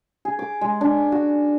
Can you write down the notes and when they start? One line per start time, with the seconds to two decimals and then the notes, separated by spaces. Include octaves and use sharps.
0.25 G#4
0.39 D6
0.61 G#3
0.81 D4
1.12 F#4